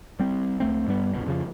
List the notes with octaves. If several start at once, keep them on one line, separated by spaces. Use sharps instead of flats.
G3 C4
C#2 A3 C4
G2 G3 B3
G1 C#2 B2
F2 C#3 F3